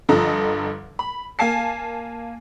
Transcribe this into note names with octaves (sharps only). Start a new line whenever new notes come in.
G2 D3 F3 A4 D#5 A#5
B5
A#3 F5 G#5 A5 C7